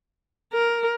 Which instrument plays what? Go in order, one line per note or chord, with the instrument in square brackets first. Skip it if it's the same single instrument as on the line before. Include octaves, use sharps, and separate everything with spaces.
[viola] A#4